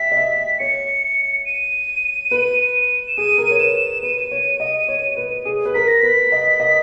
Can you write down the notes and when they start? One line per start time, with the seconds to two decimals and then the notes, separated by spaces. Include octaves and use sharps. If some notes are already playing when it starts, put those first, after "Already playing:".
Already playing: E5 G5 B6
0.12 D#5
0.17 E5
0.59 C#5 C#7
1.45 D#7
2.31 B4
3.08 E7
3.17 G#4 D#7
3.38 A#4
3.51 C#5
3.60 B4 E7
4.03 B4 D#7
4.31 C#5
4.60 D#5
4.88 C#5
5.17 B4
5.45 G#4
5.66 B4
5.75 A#4 B6
5.88 A#6
6.01 B4 B6
6.32 D#5
6.60 D#5